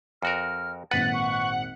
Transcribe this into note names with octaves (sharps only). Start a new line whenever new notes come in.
F2 F#4 A#4 F6
G#1 A#2 B4 F#5 A6 B6
C#6